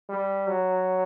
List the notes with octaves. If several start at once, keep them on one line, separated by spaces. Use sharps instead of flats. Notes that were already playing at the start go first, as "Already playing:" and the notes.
G3
F#3